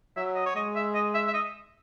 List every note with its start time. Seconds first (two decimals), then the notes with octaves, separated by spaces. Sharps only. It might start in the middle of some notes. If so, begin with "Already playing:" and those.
0.16 F#3 E5
0.35 D#5
0.46 C#5
0.56 G#3 D#5
0.75 E5
0.94 D#5
1.15 E5
1.27 E5
1.34 D#5